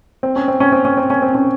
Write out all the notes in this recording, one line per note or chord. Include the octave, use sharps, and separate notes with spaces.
C4
C#4
C4
C#4
C4
C#4
C4
C#4
C4
C#4